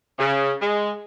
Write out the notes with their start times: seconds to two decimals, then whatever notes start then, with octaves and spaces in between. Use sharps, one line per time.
0.19 C#3
0.62 G#3